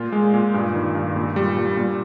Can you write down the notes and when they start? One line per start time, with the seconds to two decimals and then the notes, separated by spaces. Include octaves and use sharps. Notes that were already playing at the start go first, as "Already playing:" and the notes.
Already playing: A#2 F4
0.12 G#3
0.34 A#2
0.54 G2
0.74 D#3
0.95 G2
1.16 A#2
1.36 G3
1.57 A#2
1.77 A#2